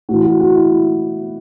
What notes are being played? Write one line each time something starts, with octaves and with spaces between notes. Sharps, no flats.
A2 E3 F#4
F#4
F#4
E4
E4